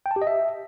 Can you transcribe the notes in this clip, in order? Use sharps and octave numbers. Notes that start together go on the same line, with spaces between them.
G5
A5
G4
D#5
E5